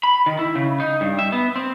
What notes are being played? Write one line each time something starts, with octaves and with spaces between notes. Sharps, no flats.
B5
D#3
E4
C#3
D#4
G2
E5
B3
C4